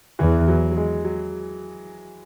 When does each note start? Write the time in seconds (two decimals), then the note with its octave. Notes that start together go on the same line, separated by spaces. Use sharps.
0.19 E2 E3
0.48 F#3
0.71 F#3
0.76 G#3
1.04 F#3